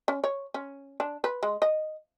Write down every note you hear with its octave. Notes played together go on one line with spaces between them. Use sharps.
C#4
C#5
C#4
D4
B4
G#3
D#5